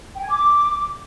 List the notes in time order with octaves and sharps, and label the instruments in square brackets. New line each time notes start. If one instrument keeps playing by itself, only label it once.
[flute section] G5
G#5
D6